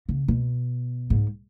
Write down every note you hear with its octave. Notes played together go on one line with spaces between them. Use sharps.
C#3
B2
G#2